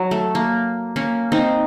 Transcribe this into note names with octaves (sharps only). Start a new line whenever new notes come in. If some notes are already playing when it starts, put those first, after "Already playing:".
Already playing: F#3
A3
A#3
A#3 C#4
C4 D#4